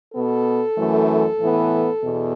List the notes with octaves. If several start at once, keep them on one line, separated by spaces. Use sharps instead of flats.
B2 B3 A4
F#2 E3 A3
A2 E3 B3
E2 B2